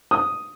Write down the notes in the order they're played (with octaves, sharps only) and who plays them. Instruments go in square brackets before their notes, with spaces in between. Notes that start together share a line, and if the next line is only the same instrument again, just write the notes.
[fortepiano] D#6